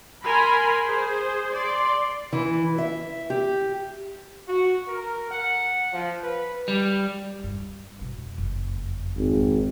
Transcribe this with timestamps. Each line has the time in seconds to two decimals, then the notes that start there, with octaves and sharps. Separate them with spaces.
0.25 A#4 G#5 B5 C6
0.85 G#4 C5
1.55 D5 C6
2.33 E3
2.78 E5
3.30 G4
4.48 F#4
4.88 A#4
5.31 F#5
5.93 F3
6.24 B4
6.68 G3
7.44 G2
7.99 F2 B2
8.38 F#1 F2
9.17 G#1